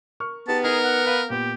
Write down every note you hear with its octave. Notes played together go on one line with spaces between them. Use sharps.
A#4 C#6 F6
B3 D#4 G4 G#4 A5
D#4 G#4 A#4
F#5
B4 F5
A#2 B3 G4